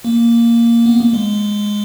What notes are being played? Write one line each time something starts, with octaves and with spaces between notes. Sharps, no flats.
A#3
B3
A#3
G#3